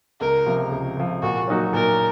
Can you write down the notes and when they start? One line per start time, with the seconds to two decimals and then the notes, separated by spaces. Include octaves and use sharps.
0.20 C#2 A#4
0.46 C3 F3
0.71 C#2
0.97 C3 F3
1.22 A#2 F#4
1.48 F#3 A#3 D#4 F#4
1.73 A#2 A#4